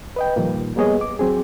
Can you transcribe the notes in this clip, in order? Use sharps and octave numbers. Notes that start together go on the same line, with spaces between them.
B4 D#5 G5
A#2 D#3 F3 G3 A#3
G3 A#3 B3 G#4 C#5 D#5
D6
F#3 C4 G#4